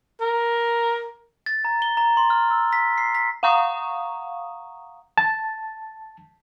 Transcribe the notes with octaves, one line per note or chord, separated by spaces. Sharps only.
A#4
A6
A#5
G7
A#5
C6
F6
E6
B6
C7
B6
F5 F#5 A#5 C#6 D#6
A5